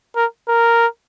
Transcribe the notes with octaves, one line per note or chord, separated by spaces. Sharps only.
A#4
A#4